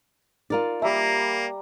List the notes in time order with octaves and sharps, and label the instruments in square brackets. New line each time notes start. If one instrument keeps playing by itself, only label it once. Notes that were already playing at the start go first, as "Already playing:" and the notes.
[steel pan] D#4 [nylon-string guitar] F4 A#4 D5
[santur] G3 A#5 [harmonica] A#3 [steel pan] E5